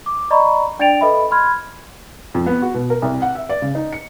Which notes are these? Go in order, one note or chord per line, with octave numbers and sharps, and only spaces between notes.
D6
D5 D#5 A#5 B5 C#6
D4 D5 G5 A6 D7 F7
A4 B4 D#5 E5 B5
B5 C6 F6 G#6
F2
B3
F#4
B2
A#4
C2
F#5
E5
D5
C#3
D#4
C#7